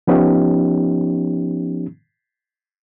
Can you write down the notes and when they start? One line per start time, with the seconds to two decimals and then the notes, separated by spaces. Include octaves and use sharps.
0.07 F3 B3 C#4 D#4 G4